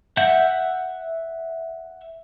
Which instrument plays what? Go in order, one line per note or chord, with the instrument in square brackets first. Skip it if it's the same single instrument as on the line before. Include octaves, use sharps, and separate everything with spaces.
[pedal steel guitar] E5 F#5 G6